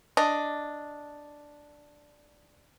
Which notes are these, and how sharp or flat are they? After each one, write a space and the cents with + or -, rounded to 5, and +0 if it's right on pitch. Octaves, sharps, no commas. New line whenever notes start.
D4 +0 D#5 +0